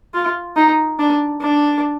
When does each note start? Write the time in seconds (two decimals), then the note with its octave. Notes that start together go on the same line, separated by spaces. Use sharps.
0.14 F4
0.56 D#4
1.00 D4
1.41 D4